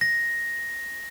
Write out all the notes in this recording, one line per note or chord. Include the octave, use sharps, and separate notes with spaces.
A#6